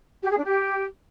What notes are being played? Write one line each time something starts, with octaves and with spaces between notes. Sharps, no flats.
G4
G#4
D4
G4